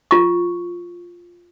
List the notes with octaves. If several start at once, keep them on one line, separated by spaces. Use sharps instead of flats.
F4 C#6